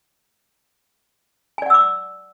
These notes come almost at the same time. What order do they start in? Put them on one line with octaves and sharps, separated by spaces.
G#5 D5 F#5 E6 D6